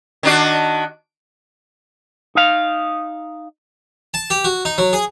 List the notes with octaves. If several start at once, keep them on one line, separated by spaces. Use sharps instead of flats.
D#3 D4 F#4
D#4 F5
A5
G4
F#4
D#4
F#3
G#4